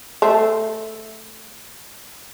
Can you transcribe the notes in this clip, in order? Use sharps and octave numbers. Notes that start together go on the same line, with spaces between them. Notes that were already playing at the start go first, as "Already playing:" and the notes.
A3 C5 E5